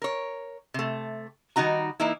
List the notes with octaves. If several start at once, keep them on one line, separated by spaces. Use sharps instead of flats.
A#4 C#5
C3 A3
D#3 G3 D#4 F#4 A#5
E3 A#3 D#4 E4